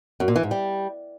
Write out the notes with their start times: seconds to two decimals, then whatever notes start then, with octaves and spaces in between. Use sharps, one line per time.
0.20 F#2
0.28 A#2
0.36 E3
0.43 G#2
0.51 G3